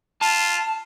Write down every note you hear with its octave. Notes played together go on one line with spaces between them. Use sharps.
F4 A5